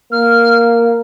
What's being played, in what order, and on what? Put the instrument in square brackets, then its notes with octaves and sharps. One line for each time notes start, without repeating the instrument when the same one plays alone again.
[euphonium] A#3 [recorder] F6